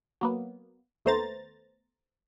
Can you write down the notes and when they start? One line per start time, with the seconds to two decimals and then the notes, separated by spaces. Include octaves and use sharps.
0.21 F#3 A#3 B3
1.05 D#2 A3 B3 C5 A#5 A6